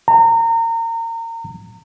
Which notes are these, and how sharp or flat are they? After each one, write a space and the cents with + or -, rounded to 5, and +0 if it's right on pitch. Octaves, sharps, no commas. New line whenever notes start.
A#5 -30